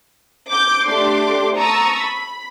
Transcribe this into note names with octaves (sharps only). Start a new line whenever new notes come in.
D6 G6
A3 D4 G4 C6 D6
A5 A#5 C#6 D#6 E6
B5